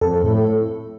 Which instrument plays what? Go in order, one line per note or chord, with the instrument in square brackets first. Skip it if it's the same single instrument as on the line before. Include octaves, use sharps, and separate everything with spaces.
[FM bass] F2 [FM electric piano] A4
[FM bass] A2